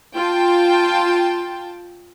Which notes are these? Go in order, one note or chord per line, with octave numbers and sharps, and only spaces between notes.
F4 G5 A5